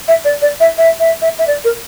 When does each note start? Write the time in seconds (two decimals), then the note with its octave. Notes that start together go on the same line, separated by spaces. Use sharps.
0.08 E5
0.25 D5
0.42 D5
0.60 E5
0.78 E5
1.00 E5
1.22 E5
1.39 E5
1.47 D5
1.65 A#4